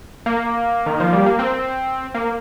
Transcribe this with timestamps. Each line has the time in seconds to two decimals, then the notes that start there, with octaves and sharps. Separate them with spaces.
0.26 A#3
0.86 D#3
1.00 F3
1.13 G3
1.26 A#3
1.39 C4
2.14 A#3